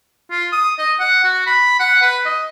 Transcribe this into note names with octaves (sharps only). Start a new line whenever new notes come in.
F4
D#6
D#5
F#5
F#4
B5
F#5
B4
D#5